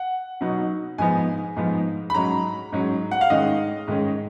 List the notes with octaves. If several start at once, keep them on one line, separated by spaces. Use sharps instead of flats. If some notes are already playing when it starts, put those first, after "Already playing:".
Already playing: F#5
B2 F#3 B3 D#4
G#2 F3 B3 D#4 G#5
G#2 F3 B3 D#4
B5
G#2 F#3 C#4 A#5
G#2 F#3 C#4
F#5
F5
G#2 D#3 G#3 C#4 D#5
G#2 D#3 G#3 C#4